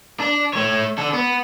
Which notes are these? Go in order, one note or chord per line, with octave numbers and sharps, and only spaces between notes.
D4
A3 C#5
D4 A4
B3